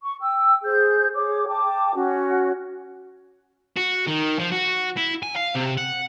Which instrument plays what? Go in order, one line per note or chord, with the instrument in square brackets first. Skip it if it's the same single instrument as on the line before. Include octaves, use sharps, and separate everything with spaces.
[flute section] C#6
G5 E6
G#4 C5 G6
G#4 C#5 D6
G5 A5 D6
C#4 F#4
[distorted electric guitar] F#4
D#3
F3
F#4
E4
G#5
F5
C3
F#5